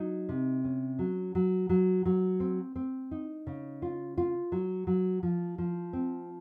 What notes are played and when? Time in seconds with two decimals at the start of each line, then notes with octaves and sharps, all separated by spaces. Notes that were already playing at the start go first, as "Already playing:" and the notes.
Already playing: F#3 D#4
0.29 C3
0.65 C#4
0.99 F#3
1.35 F#3
1.69 F#3
2.05 F#3
2.40 C4
2.76 C4
3.11 D#4
3.47 C#3
3.82 F4
4.18 F4
4.52 F#3
4.87 F#3
5.23 F3
5.58 F3
5.93 C4